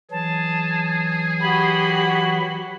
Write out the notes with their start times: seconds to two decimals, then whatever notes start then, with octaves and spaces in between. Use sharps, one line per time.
0.11 E3 F#3 G#4 A5
1.41 F#4 G4 B5